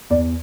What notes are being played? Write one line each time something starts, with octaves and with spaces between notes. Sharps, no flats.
E2 D5